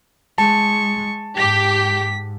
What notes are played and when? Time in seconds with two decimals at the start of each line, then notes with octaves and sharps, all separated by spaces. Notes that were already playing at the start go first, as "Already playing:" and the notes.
0.38 G#3 A5 C#6
1.37 G#2 G4 B6